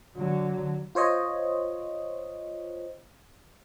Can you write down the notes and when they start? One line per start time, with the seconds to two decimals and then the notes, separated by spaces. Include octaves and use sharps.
0.17 D3 F#3
0.95 F4 C5 C#5 D#5